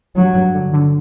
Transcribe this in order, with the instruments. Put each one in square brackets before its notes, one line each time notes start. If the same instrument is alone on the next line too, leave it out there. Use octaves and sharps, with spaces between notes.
[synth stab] G2 [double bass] F#3
[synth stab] G2
D3
D3